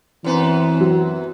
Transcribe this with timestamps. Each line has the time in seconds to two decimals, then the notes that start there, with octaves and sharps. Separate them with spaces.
0.24 F#2 E3 B3 C4
0.80 F#3